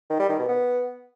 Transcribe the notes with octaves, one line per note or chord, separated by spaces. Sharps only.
D#3
G3
D#3
B2
B3